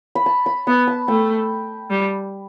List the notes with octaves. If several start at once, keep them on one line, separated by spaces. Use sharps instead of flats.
B5
A5
B5
B3 B5
A5
A3 G5
G3